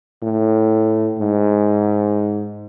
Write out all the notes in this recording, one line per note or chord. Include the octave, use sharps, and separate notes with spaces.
A2
G#2